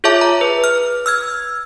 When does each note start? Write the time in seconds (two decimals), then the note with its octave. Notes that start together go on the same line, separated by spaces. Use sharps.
0.04 F4 G#4 C#5 E5 A5 D6
0.21 A#5
0.41 B4
0.64 F6
1.06 E6 F6 G#6